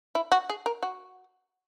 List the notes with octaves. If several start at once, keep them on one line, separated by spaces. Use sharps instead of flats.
E4
F#4
G#4
A#4
F#4